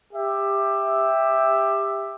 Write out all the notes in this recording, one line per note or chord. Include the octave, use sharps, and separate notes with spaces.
G4 E5